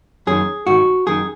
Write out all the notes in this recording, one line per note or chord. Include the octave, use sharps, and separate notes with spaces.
F#2 D#3 G#4
G#2 D#3 F#4
F#2 D#3 G#4